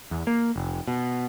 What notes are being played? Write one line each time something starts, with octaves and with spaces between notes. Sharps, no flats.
E2
A#3
F1
B2